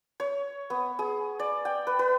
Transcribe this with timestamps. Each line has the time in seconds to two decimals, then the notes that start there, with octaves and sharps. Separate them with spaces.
0.20 C#5
0.70 B3
0.99 G#4
1.39 D5
1.65 G5
1.87 B4
1.99 B4